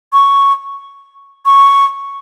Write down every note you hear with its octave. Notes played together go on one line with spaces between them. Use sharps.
C#6
C#6